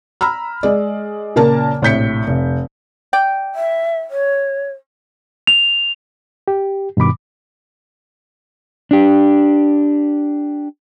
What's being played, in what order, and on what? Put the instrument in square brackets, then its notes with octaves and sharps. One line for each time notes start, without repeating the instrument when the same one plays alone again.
[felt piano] A#5 B5 E6 F6
G#3 D5
A#2 C#3 A#3 A#4 A5
A#1 A2 C3 G6 B6 C#7
F1
[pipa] D5 G5
[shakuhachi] E5
C#5
[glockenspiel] F7
[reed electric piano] G4
G2 B2 D#3 B5 D6
[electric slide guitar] D4 G4